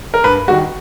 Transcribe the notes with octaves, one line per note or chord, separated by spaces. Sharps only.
A#4
G2 B4
D#3 G3 F#4